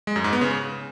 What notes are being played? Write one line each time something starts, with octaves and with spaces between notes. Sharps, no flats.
G#3
F#2
G#2
B3
C#3